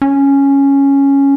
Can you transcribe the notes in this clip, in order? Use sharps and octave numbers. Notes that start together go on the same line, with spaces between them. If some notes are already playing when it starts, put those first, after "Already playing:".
C#4